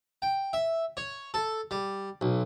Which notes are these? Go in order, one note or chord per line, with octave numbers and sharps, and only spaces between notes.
G5
E5
C#5
A4
G3
B1